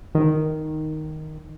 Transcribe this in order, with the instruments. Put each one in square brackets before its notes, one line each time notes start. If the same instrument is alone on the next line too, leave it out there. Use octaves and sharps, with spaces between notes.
[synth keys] D#3